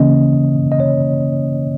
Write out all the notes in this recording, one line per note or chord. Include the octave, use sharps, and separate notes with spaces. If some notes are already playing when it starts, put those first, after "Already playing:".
Already playing: C#3 E3 A#3 C#4 D#5
D#5
C#5